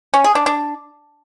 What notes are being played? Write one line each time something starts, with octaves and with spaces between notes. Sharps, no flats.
C#4
G#4
D4
D4